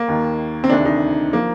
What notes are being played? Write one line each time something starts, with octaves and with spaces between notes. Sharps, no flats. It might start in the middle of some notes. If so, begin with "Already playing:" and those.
Already playing: A#3
D#2 D#3
C4
D2 C3 D#3 D4
D#4
F3 A#3